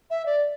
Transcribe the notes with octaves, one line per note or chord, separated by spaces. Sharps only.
E5
D5